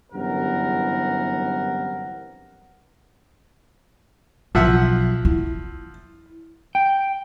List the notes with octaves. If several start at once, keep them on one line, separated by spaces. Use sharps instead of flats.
G1 F#2 C3 E3 A#4 F#5
B1 F3 E5 F#5
E4
G5